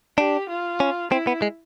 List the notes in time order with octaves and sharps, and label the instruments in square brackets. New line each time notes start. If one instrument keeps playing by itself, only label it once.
[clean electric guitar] D4 [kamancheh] G4
[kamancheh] F4
[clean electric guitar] C#4
[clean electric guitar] C4 [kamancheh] E4
[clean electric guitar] B3
G#3